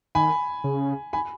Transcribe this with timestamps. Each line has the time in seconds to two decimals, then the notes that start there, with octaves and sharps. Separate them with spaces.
0.15 D#3 G#5 B5
0.64 C#3
1.13 G#5 B5